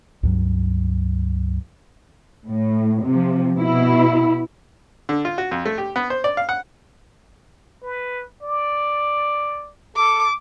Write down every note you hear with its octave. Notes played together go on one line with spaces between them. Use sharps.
C#2 G2 F#3
A2
C3 F3
B2 E4
D3
F4
F#4
F2
A3
G4
B3
C5
D5
F5
F#5
B4
D5
A4 D6